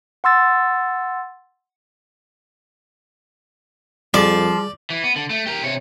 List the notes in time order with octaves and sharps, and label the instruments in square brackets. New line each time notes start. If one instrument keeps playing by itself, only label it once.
[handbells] F#5 C6 E6 A6
[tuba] F2 [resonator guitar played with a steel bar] F3 [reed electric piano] G3 G#4 [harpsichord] D5
[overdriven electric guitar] E3
B3
D3
A3
G4 A#4
C3 C#5